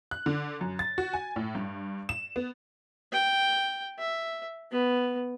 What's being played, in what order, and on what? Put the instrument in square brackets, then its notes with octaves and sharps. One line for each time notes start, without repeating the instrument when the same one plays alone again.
[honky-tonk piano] F#6
D3
F#2
A6
F#4
G#5
A2
G2
E7
B3
[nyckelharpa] G5
E5
B3